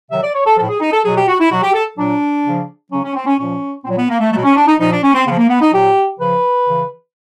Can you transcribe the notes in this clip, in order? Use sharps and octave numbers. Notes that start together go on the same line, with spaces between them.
C3 D#3 F#3 E5
D5
C#5
A4
A2 F3 A4
G#4
D#4
A4
B2 F#3 G#4
G4
F#4
E4
B2 F#3 F#4
G4
A4
A#2 F#3 D4
C#3 F3
C#3 F#3 C#4
C#4
C4
C#4
A#2 F3 C#4
A#2 F#3 C4
B3
A#3
A3
B2 F#3 A3
C#4
D4
D#4
A#2 F3 D#4
D4
C#4
C4
C#3 F3 B3
A#3
B3
D#4
A#2 F#3 G4
C#3 F3 B4
C#3 E3